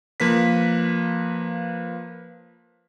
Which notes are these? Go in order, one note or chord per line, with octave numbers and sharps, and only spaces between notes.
F3 A#3 B4 B6